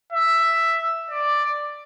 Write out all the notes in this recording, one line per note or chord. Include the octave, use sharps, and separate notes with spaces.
E5
D5